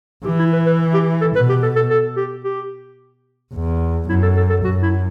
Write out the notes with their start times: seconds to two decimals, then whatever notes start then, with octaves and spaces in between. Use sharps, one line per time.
0.25 E3 G4
0.39 E4
0.53 B4
0.66 B4
0.94 G4
1.21 A4
1.35 B2 B4
1.49 G4
1.63 A4
1.76 A4
1.90 A4
2.16 G4
2.45 G4
3.54 E2
4.08 F#2 E4
4.23 A4
4.37 A4
4.50 A4
4.64 F#2 F#4
4.83 E4